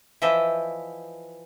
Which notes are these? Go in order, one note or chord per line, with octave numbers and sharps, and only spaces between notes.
E3 F3 D#5 E5